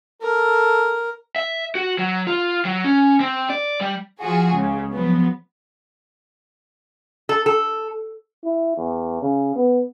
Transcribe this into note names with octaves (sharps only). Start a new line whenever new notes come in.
A4 A#4
E5
F#4
F#3
F4
F#3
C#4
C4
D5
G3
F3 F4 F#4 G#4
C#2 C#3
F3 F#3 B3
A4
A4
E4
E2
C#3
B3